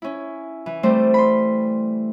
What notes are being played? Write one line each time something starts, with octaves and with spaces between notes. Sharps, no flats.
C#4 E4
E3
G3 A3 C4 C5 D5
B5 C6